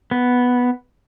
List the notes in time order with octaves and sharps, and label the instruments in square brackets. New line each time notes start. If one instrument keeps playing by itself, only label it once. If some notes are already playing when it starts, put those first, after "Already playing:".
[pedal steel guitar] B3